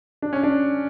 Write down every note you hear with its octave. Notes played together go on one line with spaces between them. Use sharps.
D4
C#4
D4